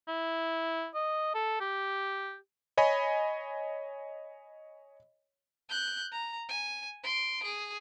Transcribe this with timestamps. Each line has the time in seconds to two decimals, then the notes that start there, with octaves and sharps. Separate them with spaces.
0.08 E4
0.95 D#5
1.35 A4
1.61 G4
2.78 C#5 D#5 G#5 B5
5.70 F#6 G6
6.12 A#5
6.49 G#5
7.04 C6 D7
7.43 G#4